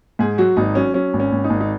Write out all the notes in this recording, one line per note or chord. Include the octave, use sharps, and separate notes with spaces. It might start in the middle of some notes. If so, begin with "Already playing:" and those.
G#2 G#4
F#3 F#4
G#1 D#4
F#3 C#4
F#3 C#4
G#1
C#4
G#1
D#4
G#1
D#4